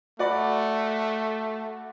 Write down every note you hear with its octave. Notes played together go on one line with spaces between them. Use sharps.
A3 F#4 D5 B5